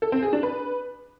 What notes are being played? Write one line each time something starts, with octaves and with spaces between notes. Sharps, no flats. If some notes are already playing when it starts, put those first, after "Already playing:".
A4
C4
G#4
D4
B4